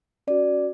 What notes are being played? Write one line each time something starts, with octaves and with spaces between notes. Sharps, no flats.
C#4 F#4 D5